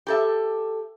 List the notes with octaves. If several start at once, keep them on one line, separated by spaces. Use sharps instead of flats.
G4 A4 E5